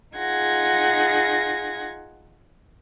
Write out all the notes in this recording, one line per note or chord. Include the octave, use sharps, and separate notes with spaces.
D#4 F4 G#4 F#5 G#6 A#6